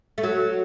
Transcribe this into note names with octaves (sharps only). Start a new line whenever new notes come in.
A3
F#3